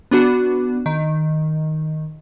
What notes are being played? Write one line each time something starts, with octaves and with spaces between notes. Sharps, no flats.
B3 D4 F#4
D#3